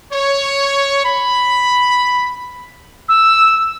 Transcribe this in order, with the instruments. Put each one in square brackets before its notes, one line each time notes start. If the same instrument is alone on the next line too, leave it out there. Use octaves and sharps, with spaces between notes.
[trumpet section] C#5
B5
[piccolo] E6